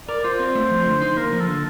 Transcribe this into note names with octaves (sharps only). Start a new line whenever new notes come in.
A#4 D5
F4 C5
C4
A3
F3
D3
D#4
A#3 A#4
F3
A4
D3